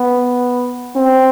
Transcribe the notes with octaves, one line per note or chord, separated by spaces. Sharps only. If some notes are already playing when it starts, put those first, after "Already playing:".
Already playing: B3
C4